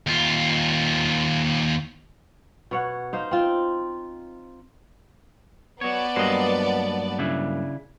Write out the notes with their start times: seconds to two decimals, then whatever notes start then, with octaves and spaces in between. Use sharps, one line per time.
0.07 D#2 F4
2.71 B2 C#5 F#5
3.13 D#4 C5 F5
3.31 C4 F4
5.81 B3 F#4 C#5 D5 A5
6.16 G2 F#3 A#3 C5 D#5
7.19 C#3 D4 E4